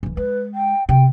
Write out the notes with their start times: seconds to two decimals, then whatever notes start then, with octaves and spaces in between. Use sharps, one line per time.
0.03 D1 E3
0.17 G#3 B4
0.54 G5
0.89 C3 G5